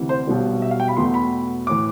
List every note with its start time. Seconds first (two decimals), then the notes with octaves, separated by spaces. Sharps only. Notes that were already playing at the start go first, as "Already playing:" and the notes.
Already playing: D2 C3 E3
0.09 C5
0.27 B1 B2 G3
0.62 E5
0.71 F5
0.80 G5
0.88 B5
0.97 E2 B2 A3 C6
1.14 B5
1.67 A2 E3 D6